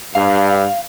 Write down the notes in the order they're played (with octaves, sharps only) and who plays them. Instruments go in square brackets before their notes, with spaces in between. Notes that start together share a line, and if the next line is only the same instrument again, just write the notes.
[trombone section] G2 [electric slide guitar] F5